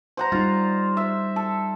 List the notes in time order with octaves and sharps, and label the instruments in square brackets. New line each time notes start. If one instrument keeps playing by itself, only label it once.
[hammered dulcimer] C5 F#5 A#5
[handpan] G3 D#4 [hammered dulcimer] F4
[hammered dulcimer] E5
A4